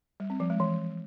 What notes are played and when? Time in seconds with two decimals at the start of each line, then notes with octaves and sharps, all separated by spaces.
0.20 G3
0.30 C4
0.40 F3
0.50 G#3
0.60 E3